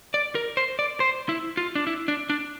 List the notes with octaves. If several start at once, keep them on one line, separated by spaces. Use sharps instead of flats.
D5
A#4
C5
D5
C5
E4
F4
D4
E4
D4
D4